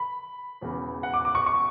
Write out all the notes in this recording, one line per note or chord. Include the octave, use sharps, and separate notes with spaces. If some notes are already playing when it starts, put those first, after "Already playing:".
Already playing: B5
E1 E2 C#3
F#5
D6
D6
C#6
C#6